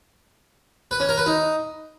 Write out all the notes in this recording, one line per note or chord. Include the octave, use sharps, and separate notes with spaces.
B4
C#4
A#4
B4
D#4